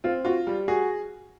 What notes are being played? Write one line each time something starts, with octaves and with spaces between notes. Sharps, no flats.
C4 F4
F4 F#4
G3
F#4 G#4